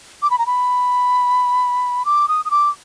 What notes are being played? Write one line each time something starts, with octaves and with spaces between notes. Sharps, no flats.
D6
B5
A#5
B5
D6
D#6
D#6
D6